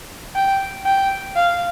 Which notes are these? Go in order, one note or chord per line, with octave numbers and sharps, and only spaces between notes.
G5
G5
F5